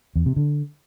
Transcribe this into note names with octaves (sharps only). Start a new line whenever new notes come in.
E2
C3
D3